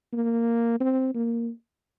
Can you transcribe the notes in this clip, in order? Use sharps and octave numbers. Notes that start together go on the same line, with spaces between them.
A#3
C4
A#3